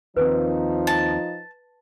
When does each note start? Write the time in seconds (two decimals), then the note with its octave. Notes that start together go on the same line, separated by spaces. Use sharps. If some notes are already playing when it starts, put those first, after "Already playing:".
0.17 D#2 D#3 F3 C4 D#4 B4
0.87 A5